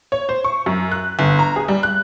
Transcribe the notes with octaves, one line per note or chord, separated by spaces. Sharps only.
C#5
C5
C#6
F#2
F#6
G1
A#5
G#4
G3
F#6